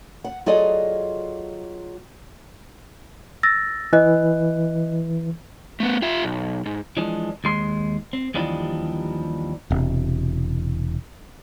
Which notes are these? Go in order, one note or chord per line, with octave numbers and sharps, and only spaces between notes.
F#5
F#3 F4 G#4 A4 D5 D#5
E6 A6 A#6
E3 D#5 F#6
A3 B3
F4 E5
B1
G#2
E3 F3 G#3 D4
D#2 G#3 C6
C4
D#2 E3 F3 G3 D4 D#4
E1 C3